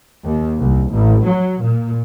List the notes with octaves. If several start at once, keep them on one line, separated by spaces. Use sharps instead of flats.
D#2
C2
A1
F#3
A#2